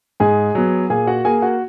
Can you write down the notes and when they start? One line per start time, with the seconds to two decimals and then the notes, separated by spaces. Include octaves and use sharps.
0.20 G#2 G#4 G#5
0.55 F#3 B3
0.90 A#2 G#4 G#5
1.07 F#4 F#5
1.25 A#3 G#4 G#5
1.42 F#4 F#5